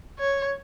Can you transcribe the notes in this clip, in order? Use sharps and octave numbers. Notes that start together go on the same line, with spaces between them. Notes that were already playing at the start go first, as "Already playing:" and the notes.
C#5